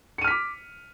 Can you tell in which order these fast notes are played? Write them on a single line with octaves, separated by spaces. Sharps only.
C#7 D#7 F6 B6 D6